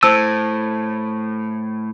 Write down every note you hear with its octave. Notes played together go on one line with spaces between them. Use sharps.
A2 C5 A5 E6